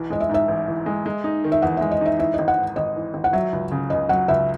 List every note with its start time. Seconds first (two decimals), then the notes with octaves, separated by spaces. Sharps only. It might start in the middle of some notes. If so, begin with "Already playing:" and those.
Already playing: B1 E3
0.10 G#3 D#5
0.20 E5
0.29 G#2
0.34 E5
0.48 A1
0.68 E3
0.86 G#3
1.06 G#3
1.24 D#4
1.44 D#3
1.52 E5
1.62 E2 F#5
1.77 G#3 E5
1.91 D#5
2.01 D#4 E5
2.19 E3 E5
2.34 G#1 D#5
2.48 F#5
2.57 G#2
2.76 G#1 D#5
2.96 E3
3.14 G#1
3.24 F#5
3.33 F#3 E5
3.52 C#2
3.72 C#3
3.90 C#2 D#5
4.09 F#3 F#5
4.28 C#2 E5